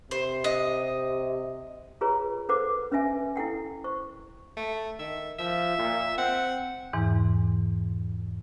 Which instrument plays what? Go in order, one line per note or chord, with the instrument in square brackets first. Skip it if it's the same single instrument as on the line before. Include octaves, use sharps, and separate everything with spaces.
[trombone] C3 [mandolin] C5
[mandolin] D#5
[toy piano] F4 G#4 B4 C#5 A#5
A4 B4 C5 F#5 D6
C#4 B4 D#5 E5 G#5
E4 A4 F#5 G5
C5 C#6
[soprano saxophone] A3
[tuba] D#3 [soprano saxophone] E5
[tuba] F3 [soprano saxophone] E5
[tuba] A#2
[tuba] C4 [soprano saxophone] F#5
[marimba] E2 G#2 E3